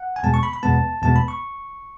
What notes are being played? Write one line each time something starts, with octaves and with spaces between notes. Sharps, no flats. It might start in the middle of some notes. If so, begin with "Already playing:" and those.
Already playing: F#5
G#5
E2 B2 G#3 B3 A5
C#6
B5
B5
E2 B2 G#3 B3 A5
E2 B2 G#3 B3 A5
B5
C#6